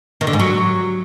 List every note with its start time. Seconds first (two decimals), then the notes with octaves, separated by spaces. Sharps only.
0.21 D#3
0.27 D3
0.33 G#2
0.39 F#3